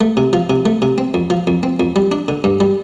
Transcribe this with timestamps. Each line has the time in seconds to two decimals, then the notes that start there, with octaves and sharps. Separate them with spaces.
0.01 A3
0.17 C3
0.33 F3
0.50 C3
0.66 A3
0.82 C3
0.98 C4
1.14 F2
1.30 F3
1.47 F2
1.63 C4
1.80 F2
1.96 G3
2.12 D4
2.28 D3
2.44 G2
2.60 G3